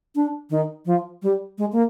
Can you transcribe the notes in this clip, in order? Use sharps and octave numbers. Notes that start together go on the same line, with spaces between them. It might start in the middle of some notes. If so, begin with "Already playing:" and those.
D4
D#3
F3
G3
G#3
A#3